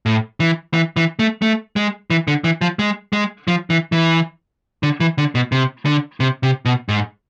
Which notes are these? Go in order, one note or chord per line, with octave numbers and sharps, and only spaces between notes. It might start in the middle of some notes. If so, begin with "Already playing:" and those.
A2
E3
E3
E3
A3
A3
G#3
E3
D3
E3
F3
G#3
G#3
F3
E3
E3
D3
E3
D3
B2
C3
D3
C3
C3
B2
G#2